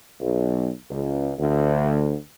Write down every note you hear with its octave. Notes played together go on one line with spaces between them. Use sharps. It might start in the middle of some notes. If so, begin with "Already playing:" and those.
B1
C#2
D2